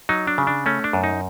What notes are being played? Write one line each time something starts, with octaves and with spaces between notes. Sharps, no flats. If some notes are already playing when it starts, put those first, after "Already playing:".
F#3 D#4
D4
C#3
D4
A3 C#4
D4
F#2
D#4